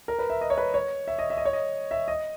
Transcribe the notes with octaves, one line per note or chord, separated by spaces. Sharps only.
A#4
B4
E5
D#5
C#5
B4
C#5
E5
D#5
E5
D#5
C#5
D#5
E5
D#5